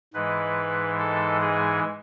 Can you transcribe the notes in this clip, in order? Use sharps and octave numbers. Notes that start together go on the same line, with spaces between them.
G#2 E3 G#3 B4
A4
G#4